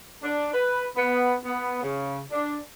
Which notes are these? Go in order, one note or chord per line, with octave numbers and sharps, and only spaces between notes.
D4
B4
B3
B3
C#3
D4